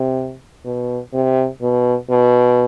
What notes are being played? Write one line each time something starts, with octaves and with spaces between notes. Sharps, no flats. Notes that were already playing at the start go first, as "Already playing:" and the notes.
Already playing: C3
B2
C3
B2
B2